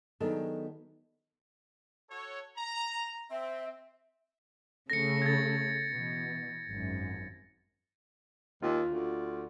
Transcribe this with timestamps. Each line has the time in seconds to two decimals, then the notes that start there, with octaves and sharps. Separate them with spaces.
0.20 D#3 F#3 B3 D4 G#4 A4
2.11 F#4 A4 C#5
2.57 A#5
3.31 C4 E5
4.90 C#3 A3 A4 A#6 C#7
5.22 G#6 A6
5.92 B2 E3
6.69 G#1 F#2
8.62 D#2 F4
8.88 D2